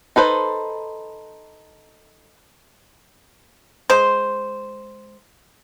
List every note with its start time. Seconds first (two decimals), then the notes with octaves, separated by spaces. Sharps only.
0.16 D#4 A4 B4 C5
3.90 G#3 C5